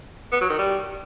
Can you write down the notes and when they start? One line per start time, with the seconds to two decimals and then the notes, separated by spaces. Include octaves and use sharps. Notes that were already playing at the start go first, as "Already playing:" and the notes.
0.32 B3
0.41 F#3
0.50 D#3
0.59 G3